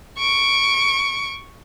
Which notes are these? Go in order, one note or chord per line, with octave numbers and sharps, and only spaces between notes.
C#6 D7